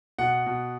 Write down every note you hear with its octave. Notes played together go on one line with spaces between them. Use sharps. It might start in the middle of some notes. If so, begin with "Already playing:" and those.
B2 F#5
B2